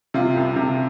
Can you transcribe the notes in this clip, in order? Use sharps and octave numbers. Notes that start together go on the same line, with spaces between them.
C3 F4
C2
C3